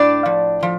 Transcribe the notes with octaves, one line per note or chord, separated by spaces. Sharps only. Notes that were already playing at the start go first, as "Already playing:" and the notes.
Already playing: A2 D4 D5
F3
F3